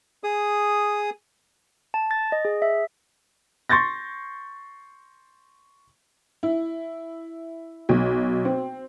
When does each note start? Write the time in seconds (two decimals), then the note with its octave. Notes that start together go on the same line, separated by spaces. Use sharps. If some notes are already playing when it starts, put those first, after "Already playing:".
0.24 G#4 D#6
1.94 A5
2.11 A6
2.32 D#5
2.45 G#4
2.62 E5
3.69 C6 C#6 G6 A6 A#6
6.43 E4
7.89 B1
8.45 C4